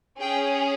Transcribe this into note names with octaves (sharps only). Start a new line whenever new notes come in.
C#4 G#4 G5